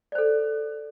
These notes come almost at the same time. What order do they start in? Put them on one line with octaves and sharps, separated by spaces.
D5 C5 A4